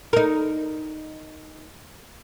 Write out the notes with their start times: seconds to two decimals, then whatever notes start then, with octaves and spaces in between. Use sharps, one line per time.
0.13 D#4 A#4